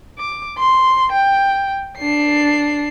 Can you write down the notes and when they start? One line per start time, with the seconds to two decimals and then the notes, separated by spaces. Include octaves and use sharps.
0.19 D6
0.58 C6
1.12 G5
1.98 D4 C7